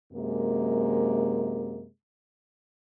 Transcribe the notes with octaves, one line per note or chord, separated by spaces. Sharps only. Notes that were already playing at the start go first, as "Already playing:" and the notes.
F#2 C3 G#3 A#3